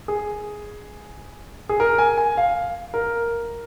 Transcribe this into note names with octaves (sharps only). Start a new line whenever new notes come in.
G#4
G#4
A#4
G#5
G#5
F5
A#4